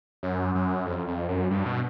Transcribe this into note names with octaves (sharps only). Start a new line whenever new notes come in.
F#2
F#2
F2
F2
F#2
G2
B2